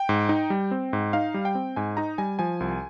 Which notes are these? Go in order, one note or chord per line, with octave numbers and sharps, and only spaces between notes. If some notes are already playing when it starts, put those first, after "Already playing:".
Already playing: G5
G#2
D#4
G3
C4
G#2
D#4 F5
G3
G5
C4
G#2 G#5
D#4 A#5
G3 G#5
F3 G#5
C2